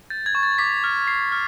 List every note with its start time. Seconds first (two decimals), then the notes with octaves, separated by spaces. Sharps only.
0.10 G6 A6
0.26 G#6
0.35 C#6
0.43 A6
0.58 D6 B6
0.84 F6
1.07 F6 C7
1.32 F6